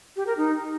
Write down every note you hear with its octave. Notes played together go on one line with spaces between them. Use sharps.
G4
A#4
D#4